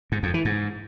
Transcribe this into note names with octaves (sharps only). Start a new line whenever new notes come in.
G#2
F2
E3
G#2